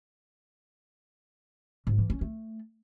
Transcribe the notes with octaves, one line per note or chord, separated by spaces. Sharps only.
G#2
E3
C#4
A3